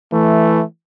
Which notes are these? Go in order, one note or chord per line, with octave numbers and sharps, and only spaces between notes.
E3 A3